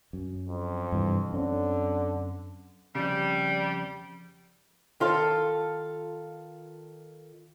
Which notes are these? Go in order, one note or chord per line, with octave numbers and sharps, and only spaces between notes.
F#2
F2
G2 C3 E3
F#2 D3 C4 C#4
F2 C#3 G3
D#3 F4 A4 F5